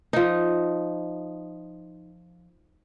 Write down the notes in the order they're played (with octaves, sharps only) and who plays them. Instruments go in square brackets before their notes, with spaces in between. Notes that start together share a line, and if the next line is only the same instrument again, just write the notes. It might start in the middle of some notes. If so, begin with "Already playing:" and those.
[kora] F3 D#4